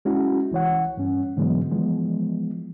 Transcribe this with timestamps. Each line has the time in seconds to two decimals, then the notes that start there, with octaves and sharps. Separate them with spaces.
0.05 G#3 C#4 E4 F#4
0.51 C2 E3 C#5 F#5
0.97 G2 C#4
1.37 G#2 D3 E3 F#3 G#3 B3
1.71 E3 F3 G#3 B3